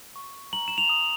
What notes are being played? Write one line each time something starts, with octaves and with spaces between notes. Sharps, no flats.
C#6
A#5 F#7
E7
F7
D#6